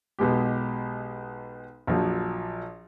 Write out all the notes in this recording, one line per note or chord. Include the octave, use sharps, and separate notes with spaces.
B1 B2 G#3 G4
A#1 F3 F#3